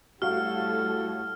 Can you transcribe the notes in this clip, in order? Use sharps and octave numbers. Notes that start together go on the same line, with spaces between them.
A2 G3 F#4 A4 F5 F6